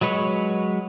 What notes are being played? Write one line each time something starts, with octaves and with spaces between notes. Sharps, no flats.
F#3 G#3 B4 C#5